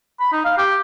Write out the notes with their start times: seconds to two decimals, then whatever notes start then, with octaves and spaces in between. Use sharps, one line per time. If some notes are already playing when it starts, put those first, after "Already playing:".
0.20 B5
0.32 D#4
0.45 F5
0.58 G4